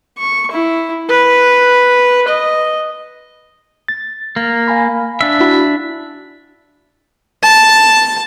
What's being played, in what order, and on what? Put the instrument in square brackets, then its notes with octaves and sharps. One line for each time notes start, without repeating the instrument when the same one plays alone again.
[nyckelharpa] C#6
E4
B4
D#5
[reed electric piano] A6
[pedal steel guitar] A#3
[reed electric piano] F5 G#5 B5
[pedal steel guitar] D4 E5
[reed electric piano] E4 F#4 B5
[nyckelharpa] A5